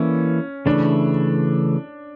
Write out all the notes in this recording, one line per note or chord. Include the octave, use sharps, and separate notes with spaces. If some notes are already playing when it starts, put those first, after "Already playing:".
Already playing: E3 A#3 C#4 E4 A4 D5
C#3 E3 A3 D4